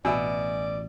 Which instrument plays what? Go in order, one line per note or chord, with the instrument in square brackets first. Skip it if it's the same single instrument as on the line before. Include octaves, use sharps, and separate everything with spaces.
[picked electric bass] A1 [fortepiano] B2 E6 [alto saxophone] D5 [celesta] E5 G#5